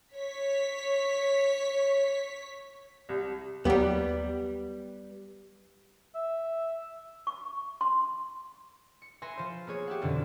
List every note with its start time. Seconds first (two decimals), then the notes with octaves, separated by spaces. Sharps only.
0.14 C#5 B6
3.09 C2
3.65 D#2 F#3 G3 B3 G4
6.15 E5
7.27 C#6
7.81 C6
9.02 C#7
9.22 B4 E5 G#5 C6 A#6 C#7
9.37 F3 C5
9.67 A#3 B3 G#4 C#5
9.88 G4 E5 F#5
10.01 F2 B2 D3 E3 C#4